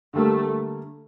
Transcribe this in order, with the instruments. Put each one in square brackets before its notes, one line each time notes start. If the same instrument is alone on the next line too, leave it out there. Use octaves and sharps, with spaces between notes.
[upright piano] D3 G3 A#3 [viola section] A3